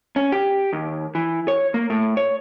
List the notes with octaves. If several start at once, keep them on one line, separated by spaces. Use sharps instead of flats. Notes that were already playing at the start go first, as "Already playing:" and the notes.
C#4
G4
D#2
E3
C#5
A#3
A2
C#5